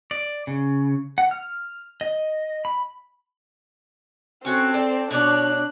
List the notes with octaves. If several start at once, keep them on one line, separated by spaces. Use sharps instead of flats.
D5
C#3
F#5
F6
D#5
B5
C4 C#4 F#4 A4
A4 D5 G5
B2 D4 C#5 D5 F#6